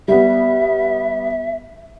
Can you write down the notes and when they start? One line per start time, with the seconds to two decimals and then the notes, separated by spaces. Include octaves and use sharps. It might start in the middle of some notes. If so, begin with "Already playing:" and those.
0.08 G3 B3 E5